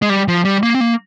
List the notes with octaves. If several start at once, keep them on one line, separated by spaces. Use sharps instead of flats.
G#3
G3
F3
G3
A#3
C4
A#3